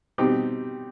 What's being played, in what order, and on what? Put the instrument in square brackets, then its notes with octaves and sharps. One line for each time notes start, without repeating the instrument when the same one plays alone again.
[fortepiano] B2 G3 C4 D#4 G4